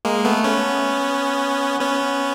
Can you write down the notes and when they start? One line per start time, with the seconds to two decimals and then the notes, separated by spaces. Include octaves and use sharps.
0.05 G#3 A#3
0.25 A3 B3
0.44 B3 C#4
1.80 B3 C#4